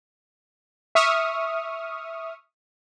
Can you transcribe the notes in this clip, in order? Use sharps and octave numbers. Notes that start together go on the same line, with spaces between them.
E5 C#6 D#6 F6